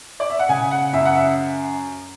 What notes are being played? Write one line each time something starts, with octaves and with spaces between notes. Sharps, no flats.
D5
E5
F#5
C#3 G#5
F#5
F#2 E5
F#5
E5